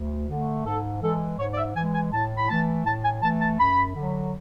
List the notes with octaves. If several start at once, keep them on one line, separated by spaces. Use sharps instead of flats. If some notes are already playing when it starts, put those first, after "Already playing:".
Already playing: D2
D3 A3
G#2 A4
E3 G#3 A4
G#2 C#5
D5
E5
E3 G#3 G#5
G#5
A2 A5
B5
E3 A3 A5
A2 A5
G#5
E3 A3 A5
A5
F#2 B5
D3 F#3